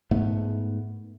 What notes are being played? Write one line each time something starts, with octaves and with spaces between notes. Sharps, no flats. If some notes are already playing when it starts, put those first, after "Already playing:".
G#2 A3 B3